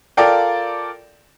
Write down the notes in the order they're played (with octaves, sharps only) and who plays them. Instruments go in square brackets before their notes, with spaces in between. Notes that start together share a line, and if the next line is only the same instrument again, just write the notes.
[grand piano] F4 A4 A#4 D5 F5 G5